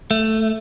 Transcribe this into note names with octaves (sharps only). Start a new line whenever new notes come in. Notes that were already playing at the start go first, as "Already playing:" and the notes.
A3